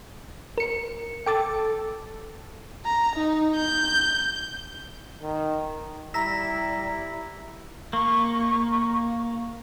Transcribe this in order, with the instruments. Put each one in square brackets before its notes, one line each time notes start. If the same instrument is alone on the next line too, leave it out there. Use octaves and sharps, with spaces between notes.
[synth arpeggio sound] A#4 C#7
[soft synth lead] A4 [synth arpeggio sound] G5 D6 A6
[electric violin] A#5
D#4
G6
[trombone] D#3
[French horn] G3 [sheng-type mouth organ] E4 [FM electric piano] A#5 E6 [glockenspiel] A#6 B6
[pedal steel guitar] A#3 [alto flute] C#6